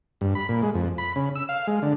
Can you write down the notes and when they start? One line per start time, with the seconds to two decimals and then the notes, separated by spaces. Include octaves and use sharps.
0.21 G2
0.35 B5
0.49 A#2
0.63 G#3
0.74 F2
0.98 B5
1.16 C#3
1.35 E6
1.49 F5
1.67 G#3
1.82 D3